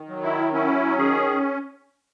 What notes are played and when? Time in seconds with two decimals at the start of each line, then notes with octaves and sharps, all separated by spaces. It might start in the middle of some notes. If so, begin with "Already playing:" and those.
Already playing: D#3
0.09 F#3
0.23 E4
0.53 C#4 E4
0.98 D#3 G#4